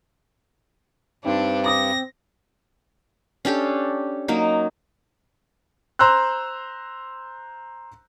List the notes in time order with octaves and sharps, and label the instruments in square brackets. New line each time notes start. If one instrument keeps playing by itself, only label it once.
[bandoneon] G2 [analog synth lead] C4 [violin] D4 [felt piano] D#4
[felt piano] D6 D#6 [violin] A#6
[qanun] C#4 D4 G4 A4
F#3 A#3 D#4
[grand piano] C5 A#5 C6 E6 F#6